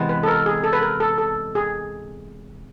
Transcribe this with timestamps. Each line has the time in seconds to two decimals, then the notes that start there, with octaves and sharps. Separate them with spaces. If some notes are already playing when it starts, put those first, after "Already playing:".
Already playing: C3 E3 G#3 B3
0.09 B4
0.23 A4
0.28 A#4
0.46 G#4
0.64 A4
0.73 B4
0.82 A#4
1.00 A4
1.18 A4
1.55 G#4